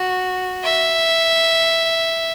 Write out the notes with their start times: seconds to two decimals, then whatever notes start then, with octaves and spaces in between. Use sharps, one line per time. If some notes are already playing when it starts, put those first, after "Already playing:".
Already playing: F#4
0.65 E5